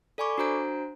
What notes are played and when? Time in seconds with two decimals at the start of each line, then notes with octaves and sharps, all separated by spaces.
0.18 A4 D5 G#5 B5 C#6 D6
0.38 D4 F#4 C5 A#5 G6 D7